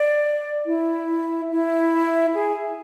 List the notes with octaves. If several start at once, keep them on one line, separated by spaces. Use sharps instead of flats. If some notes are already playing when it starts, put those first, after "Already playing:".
Already playing: D5
E4
E4
G#4